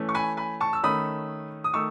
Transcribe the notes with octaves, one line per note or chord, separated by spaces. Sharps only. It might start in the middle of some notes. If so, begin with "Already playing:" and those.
Already playing: E3 A3 C#4
C#6
G#5 B5
G#5 B5
A5 C#6
E6
D#3 A3 C#4 B5 D#6
D#6
D#3 A3 C#6 E6